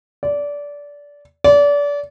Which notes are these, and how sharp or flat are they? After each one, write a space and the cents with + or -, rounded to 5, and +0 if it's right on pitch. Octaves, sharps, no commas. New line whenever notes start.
D5 -20
D5 -30